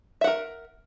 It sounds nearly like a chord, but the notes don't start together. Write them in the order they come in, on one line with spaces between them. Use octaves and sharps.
E5 F#5 A#4